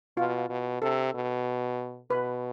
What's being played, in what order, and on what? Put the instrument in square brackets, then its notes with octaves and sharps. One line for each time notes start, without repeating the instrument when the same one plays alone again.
[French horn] B2 [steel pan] F4
[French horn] B2
[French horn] C3 [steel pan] A4
[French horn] B2
[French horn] B2 [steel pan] B4